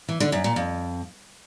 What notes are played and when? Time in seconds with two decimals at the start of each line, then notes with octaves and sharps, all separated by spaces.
0.08 E3
0.20 D3
0.32 F#2
0.44 A#2
0.56 F2